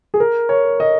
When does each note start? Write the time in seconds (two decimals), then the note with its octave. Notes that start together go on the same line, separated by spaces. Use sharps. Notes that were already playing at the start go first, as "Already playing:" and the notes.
0.14 G#4
0.20 A#4
0.49 C#5
0.80 D#5